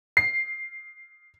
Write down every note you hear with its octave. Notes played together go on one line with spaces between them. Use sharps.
C7